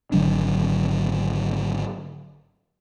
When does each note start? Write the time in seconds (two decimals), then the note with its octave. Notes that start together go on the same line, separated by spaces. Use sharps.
0.12 G#1 D3 F#3 D4